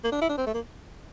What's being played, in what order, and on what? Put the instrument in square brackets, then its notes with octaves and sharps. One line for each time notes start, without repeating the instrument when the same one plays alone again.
[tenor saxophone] A#3
D4
E4
D4
C4
A3
A#3